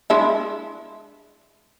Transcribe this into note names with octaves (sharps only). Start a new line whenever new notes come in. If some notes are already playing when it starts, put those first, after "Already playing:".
G#3 D4 E4